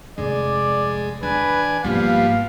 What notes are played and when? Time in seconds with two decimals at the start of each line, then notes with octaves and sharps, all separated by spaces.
0.18 F1 F2 G#3 D5
1.23 E2 D4 B4 G#5
1.84 G#2 F3 G3 A#3 B3 F5